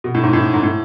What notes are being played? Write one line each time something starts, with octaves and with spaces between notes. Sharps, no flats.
B2
A2
G#2
A2
G#2
A2